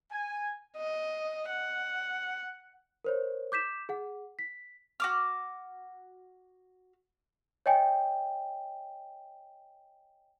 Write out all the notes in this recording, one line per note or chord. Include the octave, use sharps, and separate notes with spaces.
G#5
D#5
F#5
A#4 C5 C#5
D6 G6 B6 E7
G#4 F#5
B6
F#4 D6 F6
C#5 D#5 G5 G#5